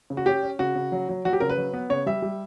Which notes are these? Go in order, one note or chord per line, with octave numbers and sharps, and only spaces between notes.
C#3
F#4
C#4 G4
C#4
C#3 F#4
C#3
F#3
F#3
F#3 F#4
G4
C#3 A#4
B4
F#3
B3
C#3 C#5
G3 E5
G3